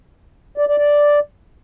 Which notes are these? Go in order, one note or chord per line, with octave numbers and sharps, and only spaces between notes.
D5
D5
D5